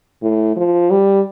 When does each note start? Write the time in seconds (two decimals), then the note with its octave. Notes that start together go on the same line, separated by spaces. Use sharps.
0.22 A2
0.57 F3
0.90 G3